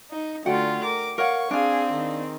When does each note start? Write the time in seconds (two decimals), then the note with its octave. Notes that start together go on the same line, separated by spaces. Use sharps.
0.11 D#4
0.46 D3 A3 F4 F#4 F#5 G5
0.84 A#4 D6
1.18 A#4 C#5 F5 F#5 C#6
1.51 C4 D4 G#4 F5
1.93 D#3